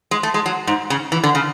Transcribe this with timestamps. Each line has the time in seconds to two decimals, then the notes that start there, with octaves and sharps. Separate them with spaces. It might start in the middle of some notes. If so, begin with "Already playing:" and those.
0.11 G#3
0.23 A3
0.34 G#3
0.46 F#3
0.67 G#2
0.90 C#3
1.12 E3
1.24 D3
1.35 C#3